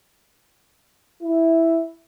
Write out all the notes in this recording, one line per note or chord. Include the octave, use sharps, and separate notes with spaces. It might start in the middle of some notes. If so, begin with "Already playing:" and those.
E4